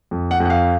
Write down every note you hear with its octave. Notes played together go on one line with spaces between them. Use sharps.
F2
F#5
F2
F#5
F5